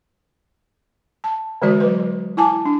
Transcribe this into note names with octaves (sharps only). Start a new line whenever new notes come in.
A5
D3 E3 G#3 F#4 D5
F#3 B4
E4 G#5 A5 D6
D4